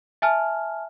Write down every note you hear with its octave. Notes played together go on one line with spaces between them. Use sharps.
E5 G#5 A5 F6